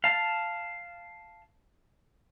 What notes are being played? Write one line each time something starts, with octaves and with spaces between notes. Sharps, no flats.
F5 A5